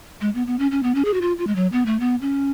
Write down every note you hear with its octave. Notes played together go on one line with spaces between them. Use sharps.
G#3
B3
B3
C#4
C#4
B3
C#4
G#4
F#4
F4
F4
G#3
F#3
B3
A3
B3
C#4